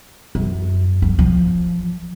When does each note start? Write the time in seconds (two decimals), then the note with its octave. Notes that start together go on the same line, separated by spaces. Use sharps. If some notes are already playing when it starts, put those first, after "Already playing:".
0.35 F#2
1.02 F3
1.19 F3